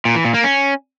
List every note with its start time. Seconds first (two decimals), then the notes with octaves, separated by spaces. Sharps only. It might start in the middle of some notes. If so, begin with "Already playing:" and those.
0.05 A#2
0.15 E3
0.25 A#2
0.34 A#3
0.44 C#4